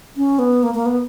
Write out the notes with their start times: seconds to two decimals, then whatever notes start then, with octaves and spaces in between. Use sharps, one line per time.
0.17 C#4
0.39 B3
0.63 A#3
0.74 A#3
0.86 B3